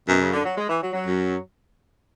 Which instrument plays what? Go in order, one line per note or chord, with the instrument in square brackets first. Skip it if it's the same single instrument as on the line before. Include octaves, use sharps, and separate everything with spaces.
[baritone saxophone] F#2 [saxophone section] B2
[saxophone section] C#3
D3
F#3
G#3
E3
F#3
F#3
[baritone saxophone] F#2